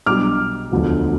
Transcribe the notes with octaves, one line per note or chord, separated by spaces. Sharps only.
B1 B2 G3 D4 D6 F6
E1 D2 D3 F3